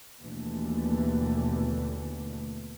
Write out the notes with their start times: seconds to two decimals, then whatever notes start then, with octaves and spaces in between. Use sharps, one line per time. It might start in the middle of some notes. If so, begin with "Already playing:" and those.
0.20 D#2 B2 D3 E3 A3